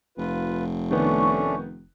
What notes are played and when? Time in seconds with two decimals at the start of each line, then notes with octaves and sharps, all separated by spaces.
0.18 F1 F4 B4
0.91 D#3 A3 B3 C#4 D4 C#6